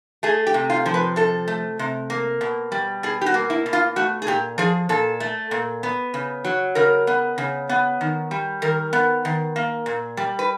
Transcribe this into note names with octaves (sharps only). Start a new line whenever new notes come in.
A3 G#4
G4
C3
F4
F3
B4
C3 A4
A3
C3
A#3
B2
G3
B2 G#4
G4
F#4
A#3
E4
B2
F4
A3 F#4
G#4
A#2 G4
F3 G#4
A#2 A4
A3
A#2
B3
C#3
F#3
C#3 A#4
B3
C#3
B3
D#3
G3
D#3 A#4
B3
D#3
A#3
A#2
G3
B4